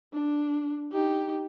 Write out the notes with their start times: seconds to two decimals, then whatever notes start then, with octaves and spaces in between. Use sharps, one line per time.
0.13 D4
0.92 D#4 G4